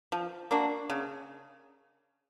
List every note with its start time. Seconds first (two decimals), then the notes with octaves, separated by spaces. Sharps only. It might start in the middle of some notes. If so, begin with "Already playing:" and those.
0.12 F3
0.51 A#3 D4 F#4
0.90 C#3